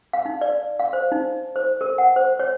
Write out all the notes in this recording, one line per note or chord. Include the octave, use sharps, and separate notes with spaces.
F5
D#4
D5
F5
C5
D#4
C5
A#4
F#5
C5
C#5